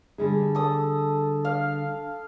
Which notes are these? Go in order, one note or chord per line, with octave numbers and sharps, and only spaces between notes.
D3 G3 G#4
A4 D#6
F5